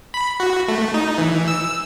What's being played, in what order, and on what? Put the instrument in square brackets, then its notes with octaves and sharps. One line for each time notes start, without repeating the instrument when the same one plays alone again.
[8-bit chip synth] B5
F#4
A3
D#4
E3
E6